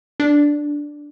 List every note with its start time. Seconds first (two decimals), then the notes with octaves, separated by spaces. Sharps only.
0.20 D4